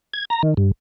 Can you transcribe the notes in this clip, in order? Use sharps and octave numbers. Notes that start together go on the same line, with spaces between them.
G#6
A#5
D#3
G2